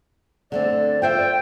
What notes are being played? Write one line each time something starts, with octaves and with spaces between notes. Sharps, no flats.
D3 A3 C4 D5
F4 C5 E5 G5